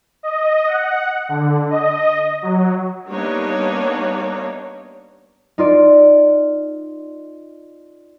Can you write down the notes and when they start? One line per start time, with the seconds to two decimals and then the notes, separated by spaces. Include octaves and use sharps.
0.23 D#5
0.68 F#5
1.29 D3
1.70 D#5
2.42 F#3
3.09 G3 A#3 B3 D4 D#4 C#5
5.58 D#4 F4 D5